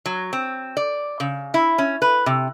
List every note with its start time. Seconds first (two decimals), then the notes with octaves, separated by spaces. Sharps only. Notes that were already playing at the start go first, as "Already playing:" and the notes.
0.06 F#3
0.33 C4
0.77 D5
1.20 C#3
1.54 E4
1.78 C#4
2.02 B4
2.26 C3